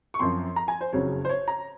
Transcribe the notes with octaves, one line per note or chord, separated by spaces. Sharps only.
C#6
F#2 F3 C4 C6
A#5
G#5
C5
F#1 F2 C#3 F#3 C#5
C5
C#5
A#5